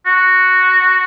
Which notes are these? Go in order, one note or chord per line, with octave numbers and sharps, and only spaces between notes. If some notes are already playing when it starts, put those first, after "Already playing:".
F#4